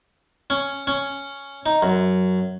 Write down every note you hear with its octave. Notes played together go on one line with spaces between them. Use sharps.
C#4
C#4
D#4
F#2